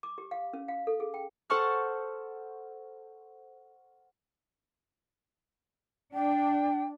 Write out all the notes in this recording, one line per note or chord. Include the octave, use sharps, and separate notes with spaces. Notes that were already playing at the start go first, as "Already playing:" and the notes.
D6
G4
F5
C#4
F5
A4
G#4
G5
A4 C5 F#5 A5 C#6 F6
D4 G5